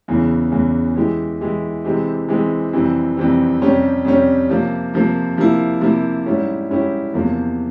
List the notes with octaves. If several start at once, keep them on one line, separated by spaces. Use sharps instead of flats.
E2 C#3 E3
E2 C#3 E3
E3 G#3 E4 G4
E3 G#3 E4 G4
C3 E3 G#3 C4 G4
C3 E3 G#3 C4 G4
F2 C3 E3 G3 C4
F2 C3 E3 G3 C4
F2 C3 G3 C#4 G4
F2 C3 G3 C#4 G4
C3 F3 A#3
C3 F3 A#3
C3 F3 A#3 E4
C3 F3 A#3 E4
G#2 G3 C#4 E4 G4
G#2 G3 C#4 E4 G4
E2 C3 F3 A#3